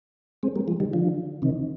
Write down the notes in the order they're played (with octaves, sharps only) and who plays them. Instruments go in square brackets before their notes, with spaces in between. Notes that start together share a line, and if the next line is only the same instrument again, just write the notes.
[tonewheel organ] G#3 C4
G3 A#3
F3 G#3
D#3 G3
D3 F3
C3 D#3